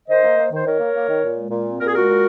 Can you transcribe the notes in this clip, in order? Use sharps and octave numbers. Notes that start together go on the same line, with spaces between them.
D#3 C5 D#5
A#3
A#3
D#3 C5
D#3 A#4 C#5
A#3
A#3
D#3
A#2
G#3
A#2
C4
A#2 A#4
G#4
G#3 F#4 A#4
A#2